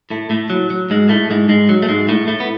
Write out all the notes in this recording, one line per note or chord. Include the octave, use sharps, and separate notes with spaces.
A2 A3
A2 A3
F#3
F#3
G#2 G#3
A2 A3
G#2 G#3
G#2 G#3
F#3
A3
G#2 G#3
A2 A3
A2 A3
B3